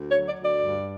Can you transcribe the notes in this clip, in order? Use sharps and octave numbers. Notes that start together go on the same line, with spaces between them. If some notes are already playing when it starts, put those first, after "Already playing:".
Already playing: D2
C#5
F#3
D5
D2
D5
G2